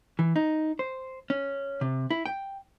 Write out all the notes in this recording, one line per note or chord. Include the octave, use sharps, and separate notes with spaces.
E3
D#4
C5
C#4
C3
E4
G5